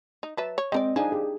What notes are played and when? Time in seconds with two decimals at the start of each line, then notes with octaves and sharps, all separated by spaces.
0.23 D#4
0.37 F#3 B4 E5 A5
0.58 C#5
0.72 G#3 C4 A#4 D5 D#5 G5
0.96 F3 D4 D#4 G#4 G#5
1.12 G4 G#4